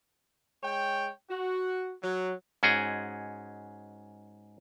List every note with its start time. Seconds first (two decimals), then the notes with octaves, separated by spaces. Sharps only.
0.63 G#3 C#5 G5
1.30 F#4
2.03 F#3
2.63 G#2 C#4 F#4 G#4 G5